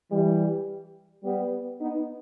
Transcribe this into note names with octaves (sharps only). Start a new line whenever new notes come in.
E3 G3
G3 B3
B3 D#4